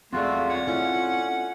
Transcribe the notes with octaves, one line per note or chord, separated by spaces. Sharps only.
E2 G#3 A3 C4 F4 F#4 D5
F4 C#5 F#5
A3 C#4 E4 F4